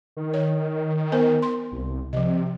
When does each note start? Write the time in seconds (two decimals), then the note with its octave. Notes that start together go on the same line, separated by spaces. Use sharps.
0.17 D#3
0.34 C#5
1.12 B3 A#4 C5
1.42 C6
1.72 C2
2.13 C3 F3 D#5